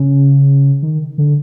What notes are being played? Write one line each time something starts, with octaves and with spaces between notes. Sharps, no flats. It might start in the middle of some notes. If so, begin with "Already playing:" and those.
Already playing: C#3
D#3
D3